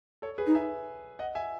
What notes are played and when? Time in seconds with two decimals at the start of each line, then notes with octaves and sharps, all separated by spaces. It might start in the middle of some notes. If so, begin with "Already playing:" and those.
0.22 A4 C#5
0.38 G#4 B4
0.47 D#4
0.55 E5 G#5
1.19 D#5 F#5
1.35 E5 G#5